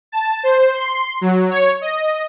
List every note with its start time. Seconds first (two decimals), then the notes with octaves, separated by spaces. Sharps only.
0.12 A5
0.43 C5
0.74 C6
1.21 F#3
1.51 C#5
1.81 D#5